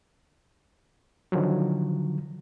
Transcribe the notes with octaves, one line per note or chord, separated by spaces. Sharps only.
D3 D#3 F3 F#3